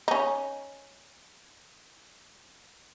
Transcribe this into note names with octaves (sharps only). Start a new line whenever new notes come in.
C#4 D#4